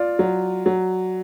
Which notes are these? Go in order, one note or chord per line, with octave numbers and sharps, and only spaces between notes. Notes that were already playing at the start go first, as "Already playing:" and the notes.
Already playing: F4 D5
F#3
F#3